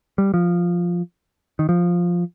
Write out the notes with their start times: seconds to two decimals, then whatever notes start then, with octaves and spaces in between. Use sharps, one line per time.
0.18 G3
0.34 F3
1.59 D#3
1.69 F3